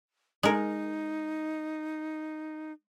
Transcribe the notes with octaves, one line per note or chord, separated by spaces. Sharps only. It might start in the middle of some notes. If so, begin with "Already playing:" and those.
G#3 D#4 A#4